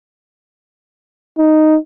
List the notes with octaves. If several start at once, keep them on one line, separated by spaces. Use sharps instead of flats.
D#4